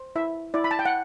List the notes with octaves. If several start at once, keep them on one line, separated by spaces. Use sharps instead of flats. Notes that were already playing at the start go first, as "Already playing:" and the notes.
Already playing: C5
E4 E5
E4 D5
B5
A5
G5
F#5